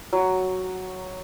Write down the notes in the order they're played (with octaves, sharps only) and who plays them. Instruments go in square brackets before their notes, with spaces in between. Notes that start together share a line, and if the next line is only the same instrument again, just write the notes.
[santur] F#3